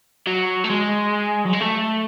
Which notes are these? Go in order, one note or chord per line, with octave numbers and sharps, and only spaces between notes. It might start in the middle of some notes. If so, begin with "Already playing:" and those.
F#3
A3
G#3
F#3
G#3
A3